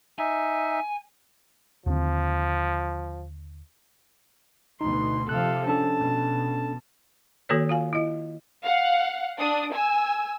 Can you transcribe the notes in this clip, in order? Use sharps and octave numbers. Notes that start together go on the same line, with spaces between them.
D#4 E5 G#5
D#2 D3 F3 C4
D2 B2 D#4 C6
C3 F3 A4 F5 F#6
C#4 D4 A4 A5
B2
D#3 A#3 F#4 A4 B4 C#5
F4 F5 G#5
E4 D#5
F5 F#5
D4 D#6
G#5 E6